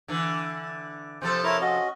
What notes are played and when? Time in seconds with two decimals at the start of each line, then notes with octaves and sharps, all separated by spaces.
0.08 D3 E3
1.22 C3 F3 A4 C5
1.44 E4 A#4 C#5
1.61 C#4 F#4 D#5